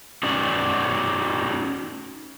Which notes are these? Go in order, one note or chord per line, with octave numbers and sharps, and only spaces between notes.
C#4 D#4 F#4 D5